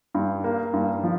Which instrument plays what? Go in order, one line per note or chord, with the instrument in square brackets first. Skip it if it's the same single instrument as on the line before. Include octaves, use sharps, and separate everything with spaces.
[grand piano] G2
A#3
G2
F3